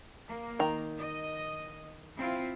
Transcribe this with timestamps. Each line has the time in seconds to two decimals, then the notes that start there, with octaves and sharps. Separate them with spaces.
0.27 A#3
0.59 D#3 A#5
0.98 D#5
2.17 C4 E4 F4